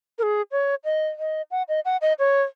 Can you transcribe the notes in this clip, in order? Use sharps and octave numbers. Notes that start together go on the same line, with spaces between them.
A#4
G#4
C#5
D#5
D#5
F#5
D#5
F#5
D#5
C#5